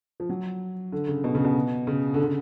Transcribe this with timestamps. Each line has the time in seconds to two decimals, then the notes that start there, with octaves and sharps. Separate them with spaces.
0.20 F3
0.29 F#3
0.92 D3
1.08 C#3
1.24 B2
1.35 C#3
1.45 B2
1.87 C#3
2.14 D3
2.24 C#3